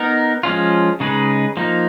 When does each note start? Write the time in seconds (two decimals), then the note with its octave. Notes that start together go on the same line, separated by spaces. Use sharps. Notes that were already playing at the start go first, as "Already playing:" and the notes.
Already playing: B3 D#4 A#4
0.43 F3 G#3 C#4 F4
1.00 C#3 G#3 D#4 G#4 B4
1.57 F3 A#3 D#4